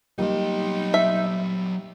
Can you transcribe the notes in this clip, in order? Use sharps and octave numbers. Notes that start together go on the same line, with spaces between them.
F#3 G3 A#3 D#4 G4 D#5
E5